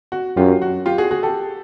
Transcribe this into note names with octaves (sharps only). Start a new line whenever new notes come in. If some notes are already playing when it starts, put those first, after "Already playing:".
F#4
F#2 F4 G4
F#4
F4 G4
F#4 G#4
F#4 G#4
G4 A4